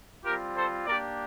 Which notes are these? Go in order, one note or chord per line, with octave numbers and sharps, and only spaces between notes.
G3 C4 F4 G4 A#4
A4 C5
A#3 D4 G4 A#4 D5